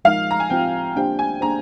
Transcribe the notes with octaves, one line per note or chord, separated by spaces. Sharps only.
F3 G#3 D#4 A#4 F5
A#5
G#5
F3 C4 F4 G5
A#3 D4 G4 C5 G5
G#5
A#3 D4 G#4 C5 A#5